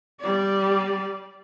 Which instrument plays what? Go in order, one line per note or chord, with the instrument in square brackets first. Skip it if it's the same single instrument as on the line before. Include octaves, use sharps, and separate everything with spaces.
[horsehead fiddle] G3 D5